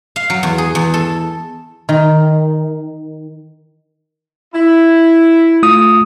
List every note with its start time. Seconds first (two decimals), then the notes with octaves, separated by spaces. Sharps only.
0.16 F5
0.30 F#3
0.43 E2
0.58 G#4
0.75 E2
0.94 A4
1.89 D#3
4.55 E4
5.63 A3 F4 D#6